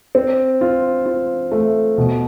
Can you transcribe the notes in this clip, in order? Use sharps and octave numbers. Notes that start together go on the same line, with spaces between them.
C4
F4
F4
A3
B2